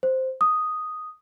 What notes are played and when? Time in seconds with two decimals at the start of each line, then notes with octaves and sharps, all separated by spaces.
0.03 C5
0.41 D#6